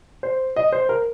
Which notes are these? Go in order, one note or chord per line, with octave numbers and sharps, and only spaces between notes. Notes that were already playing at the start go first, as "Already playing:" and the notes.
C5
D#5
C5
A#4